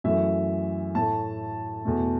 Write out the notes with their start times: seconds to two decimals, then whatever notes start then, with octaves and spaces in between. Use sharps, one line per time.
0.04 F#2 E3 A3 E5
0.95 A2 A3 A5
1.85 E2 B2 A3